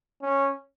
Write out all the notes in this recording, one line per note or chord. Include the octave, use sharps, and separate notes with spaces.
C#4